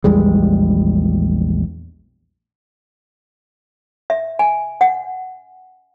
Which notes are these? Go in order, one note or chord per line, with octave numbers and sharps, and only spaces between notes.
A#1 E2 G3 G#3
E5
G#5
F#5